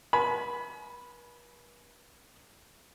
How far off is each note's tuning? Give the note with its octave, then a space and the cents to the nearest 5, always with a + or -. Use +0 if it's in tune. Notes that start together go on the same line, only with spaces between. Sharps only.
B4 -45 G#5 +35 B5 +0